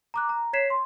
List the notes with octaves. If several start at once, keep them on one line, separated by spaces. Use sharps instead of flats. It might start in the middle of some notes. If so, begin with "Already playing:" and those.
A#5 D6 F#6
A#5
C#5 G#6 B6 C7 E7
C6